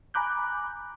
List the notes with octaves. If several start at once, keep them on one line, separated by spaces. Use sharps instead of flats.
G#5 A#5 B5 D6 F#6 G6